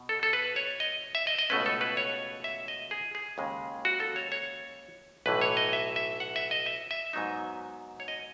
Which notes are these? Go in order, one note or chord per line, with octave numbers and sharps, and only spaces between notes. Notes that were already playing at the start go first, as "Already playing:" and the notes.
Already playing: B2
A4
A4
B4
C#5
D#5
E5
D#5
D#5
C#2 B2 A3 C#4 B4
A4
B4
C#5
E5
D#5
G#4
G#4
D#2 C#3 G#3
F#4
A4
C#5
C#5
B1 A2 E3 B4
C#5
D#5
E5
E5
F#5
E5
D#5
E5
E5
G#2 F#3 B3 D#4
C#5
D#5